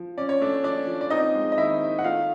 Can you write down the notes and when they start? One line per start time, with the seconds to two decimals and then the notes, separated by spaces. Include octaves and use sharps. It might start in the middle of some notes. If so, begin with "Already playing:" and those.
Already playing: F3
0.17 C#4 D5
0.29 C#5
0.41 A3 D4 D5
0.64 F3 D4 D5
0.87 F3
1.01 D5
1.10 C4 D#4 D#5
1.35 G#3
1.52 D#5
1.57 D#3 E4 E5
1.81 D#4
1.99 F#5
2.04 A3 F4 F5